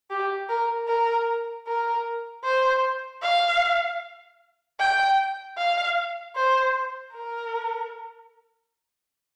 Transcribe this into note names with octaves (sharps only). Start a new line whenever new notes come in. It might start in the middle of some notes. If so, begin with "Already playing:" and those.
G4
A#4
A#4
A#4
C5
F5
G5
F5
C5
A#4